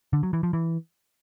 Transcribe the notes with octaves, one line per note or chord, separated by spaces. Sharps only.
D3
F#3
E3
F3
E3